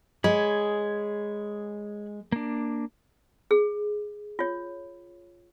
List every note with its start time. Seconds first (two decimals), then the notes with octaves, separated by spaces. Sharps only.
0.24 G#3 G#4 C#5 B5
2.32 A#3 D4
3.51 G#4
4.39 F4 C#5